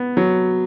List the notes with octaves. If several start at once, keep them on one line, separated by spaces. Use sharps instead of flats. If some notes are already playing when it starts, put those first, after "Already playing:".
Already playing: B3
F#3